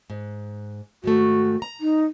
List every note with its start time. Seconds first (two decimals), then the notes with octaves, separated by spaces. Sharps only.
0.10 G#2
1.04 G#2 D#3 A3 F#4
1.62 A#5
1.81 D#4